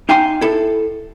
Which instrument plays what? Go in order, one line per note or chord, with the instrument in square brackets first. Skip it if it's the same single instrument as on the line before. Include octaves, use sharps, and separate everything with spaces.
[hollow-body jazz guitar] D#4 F5 G5 G#5 C6
E4 A4